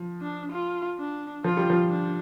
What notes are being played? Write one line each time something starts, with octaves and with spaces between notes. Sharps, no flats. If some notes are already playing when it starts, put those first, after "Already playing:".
Already playing: F3
D4
F4
D4
F3 F4
G3
F3
D4